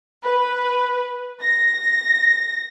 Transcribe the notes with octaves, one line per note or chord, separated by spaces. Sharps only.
B4
A#6